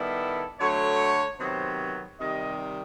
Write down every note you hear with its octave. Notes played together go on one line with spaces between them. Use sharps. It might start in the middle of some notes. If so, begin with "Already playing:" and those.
Already playing: D#3 G3 B3 E4 A4
D3 F#3 A3 C#5
C3 D#3 F#3 B3 C5
C3 D#3 G3 D#5